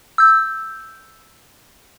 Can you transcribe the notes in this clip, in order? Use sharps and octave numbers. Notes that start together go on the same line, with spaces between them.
E6 G6